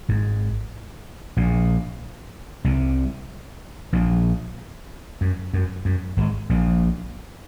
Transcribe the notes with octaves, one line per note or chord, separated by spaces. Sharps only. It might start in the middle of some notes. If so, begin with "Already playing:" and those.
G#1 G#2
A#1 A#2
C2 C3
A#1 A#2
F#2
F#2
F#2
G#1 G#2
A#1 A#2